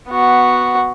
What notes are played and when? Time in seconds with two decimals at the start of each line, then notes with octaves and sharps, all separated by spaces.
0.10 B3 F#4